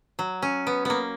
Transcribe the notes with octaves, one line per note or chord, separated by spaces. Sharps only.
F#3
C#4
B3
A#3 B3